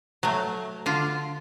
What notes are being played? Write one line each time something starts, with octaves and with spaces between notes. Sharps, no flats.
F#3 A3
D3 F4